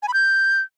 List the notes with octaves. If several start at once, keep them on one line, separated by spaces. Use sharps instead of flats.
G#5
B5
G6